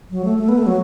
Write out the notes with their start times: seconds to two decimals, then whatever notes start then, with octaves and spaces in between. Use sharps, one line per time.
0.11 F#3
0.25 A3
0.38 A3
0.49 B3
0.58 A3
0.67 F#3